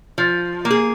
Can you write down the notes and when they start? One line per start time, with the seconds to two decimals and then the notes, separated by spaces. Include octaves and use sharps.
0.18 F3
0.65 A#3
0.70 G#4